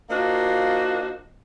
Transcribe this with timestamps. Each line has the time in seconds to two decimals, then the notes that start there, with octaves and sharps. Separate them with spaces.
0.10 A#3 D4 D#4 F4 F#4 C5